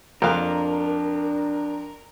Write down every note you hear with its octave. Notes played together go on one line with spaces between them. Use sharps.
F2 A#3 D4 A#4 F5